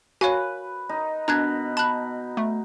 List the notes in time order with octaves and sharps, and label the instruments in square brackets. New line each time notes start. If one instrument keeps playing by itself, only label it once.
[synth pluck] F#4 [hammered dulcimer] B4 [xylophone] C#5 F5 G#5
[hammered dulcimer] D#4
[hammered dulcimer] B2 [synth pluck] D4 [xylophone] A#5 F#6 G#6
[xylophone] A5 F#6 [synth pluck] B5
[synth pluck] A3